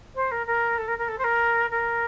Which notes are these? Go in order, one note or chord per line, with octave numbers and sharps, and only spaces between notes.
C5
A#4
A#4
A4
A#4
A#4
A4
C5
A#4
A#4